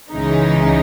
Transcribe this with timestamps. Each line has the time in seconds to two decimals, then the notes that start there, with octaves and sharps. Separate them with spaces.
0.12 C#2 C#3 E3 G#3 D#4